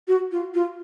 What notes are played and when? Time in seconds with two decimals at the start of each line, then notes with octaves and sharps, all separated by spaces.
0.08 F#4
0.31 F4
0.54 F4